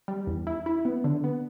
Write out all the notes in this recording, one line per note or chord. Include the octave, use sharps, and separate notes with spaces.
G3
E2
E4
E4
B3
D3
B3